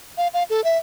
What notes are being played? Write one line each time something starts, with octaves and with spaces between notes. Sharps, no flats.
F5
F5
A4
E5